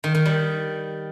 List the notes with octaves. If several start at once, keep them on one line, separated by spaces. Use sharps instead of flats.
D#3
D#3
G3